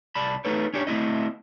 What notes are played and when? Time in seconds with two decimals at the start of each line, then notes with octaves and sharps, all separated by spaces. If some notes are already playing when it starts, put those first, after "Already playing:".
0.15 C2 D5 A5 B5
0.45 A3 D#4 A4 B4 C#5
0.74 C#4 D4 G4 C#5
0.87 A3 C4 E4 D#5